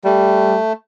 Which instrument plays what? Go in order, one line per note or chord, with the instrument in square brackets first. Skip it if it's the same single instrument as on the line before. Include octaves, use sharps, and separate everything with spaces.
[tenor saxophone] G3 [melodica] A3